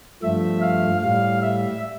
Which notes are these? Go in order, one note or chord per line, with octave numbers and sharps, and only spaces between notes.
G2 F3 A3 E5
F5
A2 G3 F5
E5